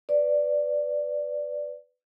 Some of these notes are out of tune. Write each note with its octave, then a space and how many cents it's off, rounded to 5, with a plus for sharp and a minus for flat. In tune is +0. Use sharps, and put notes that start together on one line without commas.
B4 +15 D5 +0